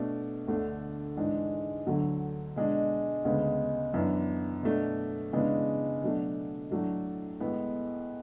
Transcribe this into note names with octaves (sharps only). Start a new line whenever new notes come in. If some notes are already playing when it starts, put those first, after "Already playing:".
Already playing: B2 A3 D4
D2 D3 A3 D4
G#2 E3 G#3 D4
D2 D3 F#3
B2 G#3 D4
D2 C#3 G#3 B3
F#2 E3 B3 D4
B2 A3 D4
C#3 E3 G#3 B3 D4
B2 F#3 A3 D4
A2 F#3 A3 D4
A2 G#3 B3